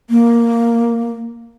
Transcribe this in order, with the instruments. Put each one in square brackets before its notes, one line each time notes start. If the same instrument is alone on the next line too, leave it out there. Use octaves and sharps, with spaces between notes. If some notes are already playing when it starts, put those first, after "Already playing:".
[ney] A#3